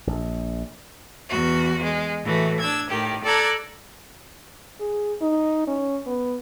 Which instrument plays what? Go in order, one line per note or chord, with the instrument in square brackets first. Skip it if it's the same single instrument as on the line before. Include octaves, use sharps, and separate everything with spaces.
[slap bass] A#1
[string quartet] E2 F#4
G#3
A2 E3 A3 F#4
D4 E6 G#6
A2 D#3 G4
A4 D5 A5 A#5 F#6 G#6
[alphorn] G#4
D#4
C#4
B3